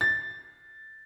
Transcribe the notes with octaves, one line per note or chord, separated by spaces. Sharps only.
A6